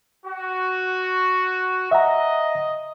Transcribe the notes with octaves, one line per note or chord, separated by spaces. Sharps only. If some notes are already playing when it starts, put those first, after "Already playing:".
F#4
D#5 E5 F#5 A#5